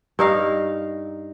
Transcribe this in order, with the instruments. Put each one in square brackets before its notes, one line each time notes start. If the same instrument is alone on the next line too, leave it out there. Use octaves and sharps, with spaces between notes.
[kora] G2 D#4 F5